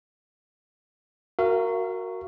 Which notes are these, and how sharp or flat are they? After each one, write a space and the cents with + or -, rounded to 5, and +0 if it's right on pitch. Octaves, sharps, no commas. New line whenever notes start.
F#4 +0 A#4 -10 F5 -45